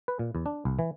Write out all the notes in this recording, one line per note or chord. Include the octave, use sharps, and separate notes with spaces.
B4
A#2
E2
D4
C2
E3